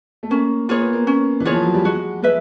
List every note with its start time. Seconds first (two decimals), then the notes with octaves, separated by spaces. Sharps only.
0.23 A3
0.30 A#3 C#4
0.69 A#3 F4 G#4 C#5
0.81 B3
0.93 A#3
1.07 C#4
1.40 E3
1.45 F4 G#4 C#5
1.52 F3
1.63 F#3
1.74 G3
1.85 G#3 F#4
2.22 G#3 B4 E5